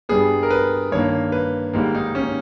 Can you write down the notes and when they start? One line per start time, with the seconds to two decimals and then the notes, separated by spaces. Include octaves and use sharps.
0.09 G2 G3 B3 G#4
0.43 A#4
0.50 B4
0.92 G2 D#3 A#3 C#5
1.32 B4
1.73 G#2 D#3 G3 A#3
1.95 D#4
2.15 C#4